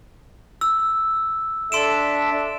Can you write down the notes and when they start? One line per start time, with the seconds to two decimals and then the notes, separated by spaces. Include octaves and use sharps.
0.61 E6
1.72 D4 A4 E5 C6 D7 E7